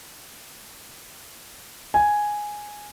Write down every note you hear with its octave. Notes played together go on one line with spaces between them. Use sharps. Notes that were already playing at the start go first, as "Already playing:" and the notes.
G#5